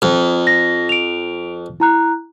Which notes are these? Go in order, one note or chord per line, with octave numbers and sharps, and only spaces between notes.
F2
A#6
D7 F7
E4 A#5 F#6